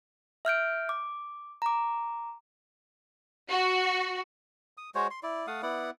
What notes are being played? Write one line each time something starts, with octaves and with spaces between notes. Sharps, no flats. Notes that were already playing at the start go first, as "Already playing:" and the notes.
E5 F6 G6 D7
D6
A#5 D6
F#4
D#6
G#3 F#4 C5 C#5
C6
E4 D5
A3 F5 F#5 D#6
B3 E4 D5 F#5